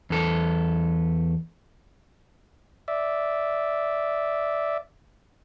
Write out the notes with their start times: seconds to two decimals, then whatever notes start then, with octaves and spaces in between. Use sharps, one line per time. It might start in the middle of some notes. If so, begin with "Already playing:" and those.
0.10 E2 A4
2.88 D5 E5